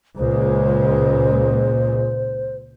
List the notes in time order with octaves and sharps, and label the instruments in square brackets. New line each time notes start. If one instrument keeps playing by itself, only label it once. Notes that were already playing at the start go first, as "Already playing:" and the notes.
[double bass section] C#2 A#2 G#3 [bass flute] C5